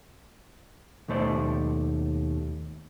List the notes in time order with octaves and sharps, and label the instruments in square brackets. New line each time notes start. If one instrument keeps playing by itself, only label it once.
[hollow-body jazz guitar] D#2 B2 A3 C5 D5